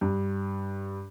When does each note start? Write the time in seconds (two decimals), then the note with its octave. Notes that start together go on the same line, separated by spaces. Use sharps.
0.01 G2